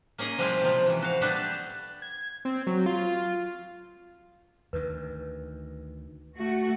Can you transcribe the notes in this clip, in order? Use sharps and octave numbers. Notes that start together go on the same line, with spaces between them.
A#3 C#4 G#4 D#5 G#5
F3 G3 G#3 E4 F4
C3 F3
C3 E3
F#4 F5
G3 B3 D4 A4 B4
G#6
C4
F#3
F4
D2 D#3 B4
A3 F#4